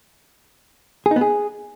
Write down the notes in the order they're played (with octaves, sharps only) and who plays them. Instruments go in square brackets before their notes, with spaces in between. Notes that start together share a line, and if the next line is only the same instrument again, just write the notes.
[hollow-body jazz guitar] G#4
D#4
B3
G#4